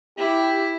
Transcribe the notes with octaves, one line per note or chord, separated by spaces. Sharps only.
E4 G4